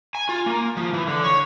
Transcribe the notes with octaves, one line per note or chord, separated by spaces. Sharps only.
G#5
F4
A#3
F3
E3
D3
C#5